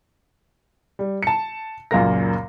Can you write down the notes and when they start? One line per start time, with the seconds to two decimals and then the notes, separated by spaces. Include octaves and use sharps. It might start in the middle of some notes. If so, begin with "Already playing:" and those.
0.99 G3
1.23 A5 C#7
1.91 C#2 F#2 A#2 A#3 A#4 A#6